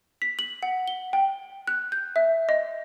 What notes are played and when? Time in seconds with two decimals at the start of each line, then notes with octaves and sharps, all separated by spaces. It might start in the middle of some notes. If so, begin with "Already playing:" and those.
0.22 B6
0.39 F#7
0.63 F#5
0.88 G7
1.13 G5
1.67 F#6
1.92 G6
2.16 E5
2.49 D#5